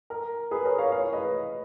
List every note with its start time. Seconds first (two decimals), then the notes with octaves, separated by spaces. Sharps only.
0.10 A#4
0.51 G#4 B4
0.65 A#4 C#5
0.78 C#5 F5
0.92 C#5 F5
1.13 B4 D#5